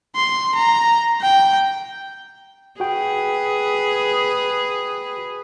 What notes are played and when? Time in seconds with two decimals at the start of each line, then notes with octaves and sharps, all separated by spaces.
0.16 C6
0.55 A#5
1.22 G5
2.80 F#4 G#4 B4 G5